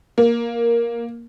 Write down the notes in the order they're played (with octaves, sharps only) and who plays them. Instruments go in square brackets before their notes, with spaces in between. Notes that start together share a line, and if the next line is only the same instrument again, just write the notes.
[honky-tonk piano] A#3